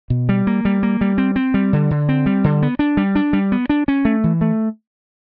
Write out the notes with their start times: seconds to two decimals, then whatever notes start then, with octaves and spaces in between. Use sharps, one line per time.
0.10 B2
0.29 G3
0.47 A#3
0.65 G3
0.83 A#3
1.01 G3
1.18 C4
1.36 C4
1.54 G3
1.73 D3
1.91 D3
2.09 C4
2.26 G3
2.44 D3
2.62 B3
2.79 D4
2.97 G3
3.15 D4
3.33 G3
3.52 B3
3.69 D4
3.88 C#4
4.05 A3
4.24 E3
4.41 A3